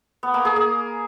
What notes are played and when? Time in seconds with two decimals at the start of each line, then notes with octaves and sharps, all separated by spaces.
0.23 B3
0.34 A#3
0.45 G#4
0.56 A#3